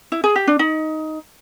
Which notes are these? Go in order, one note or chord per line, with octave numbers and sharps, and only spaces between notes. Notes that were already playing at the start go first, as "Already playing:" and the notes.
E4
G#4
G4
D4
D#4